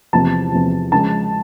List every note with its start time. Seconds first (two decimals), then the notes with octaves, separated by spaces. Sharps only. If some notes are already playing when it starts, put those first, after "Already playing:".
0.13 E2 C3 F3 A5
0.52 E2 C3 F3
0.92 C#3 F3 G#3 C#4 A5